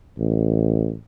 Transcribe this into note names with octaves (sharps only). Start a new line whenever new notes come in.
A1